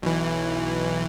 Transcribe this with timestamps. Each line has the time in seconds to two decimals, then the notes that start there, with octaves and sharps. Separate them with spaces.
0.02 B1 E3